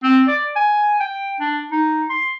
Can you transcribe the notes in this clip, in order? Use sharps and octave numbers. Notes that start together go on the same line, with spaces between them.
C4
D5
G#5
G5
D4
D#4
C6